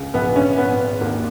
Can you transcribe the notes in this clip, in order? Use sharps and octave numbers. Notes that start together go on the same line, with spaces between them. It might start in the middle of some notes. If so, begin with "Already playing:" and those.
Already playing: C#2
A#1 B3
A#1 C#4
G#1 B3
G#1
D#2 A#3